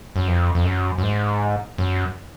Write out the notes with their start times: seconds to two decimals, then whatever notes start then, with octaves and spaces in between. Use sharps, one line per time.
0.16 F#2
0.28 F2
0.55 F2
0.65 F#2
0.98 F#2
1.03 G#2
1.78 F#2